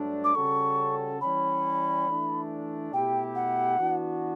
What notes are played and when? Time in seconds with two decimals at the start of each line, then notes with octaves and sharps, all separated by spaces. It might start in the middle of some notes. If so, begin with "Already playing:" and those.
Already playing: G2 F#3 A3 D4
0.24 D6
0.35 C#3 G3 C#4 F#4 A4 C#6
1.21 E3 G3 C#4 B5
2.07 E3 A3 D4
2.93 B2 A3 E4 G4 G5
3.35 F#5
3.78 E3 B3 D4 F#4